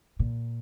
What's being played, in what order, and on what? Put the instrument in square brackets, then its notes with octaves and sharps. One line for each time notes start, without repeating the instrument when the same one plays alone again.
[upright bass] A#2